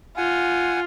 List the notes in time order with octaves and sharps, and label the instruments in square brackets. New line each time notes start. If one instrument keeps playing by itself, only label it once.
[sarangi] F4 [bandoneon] F#5 G#5